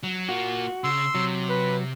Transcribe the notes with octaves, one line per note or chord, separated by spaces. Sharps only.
F#3
A#3 F4 F#4
C#3 C6 E6
C3 F#3
B4